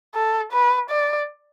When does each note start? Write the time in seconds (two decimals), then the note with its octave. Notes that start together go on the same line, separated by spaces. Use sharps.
0.15 A4
0.52 B4
0.90 D5